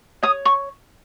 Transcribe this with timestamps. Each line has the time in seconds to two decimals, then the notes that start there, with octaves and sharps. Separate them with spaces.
0.23 C#5 D#6
0.45 C#6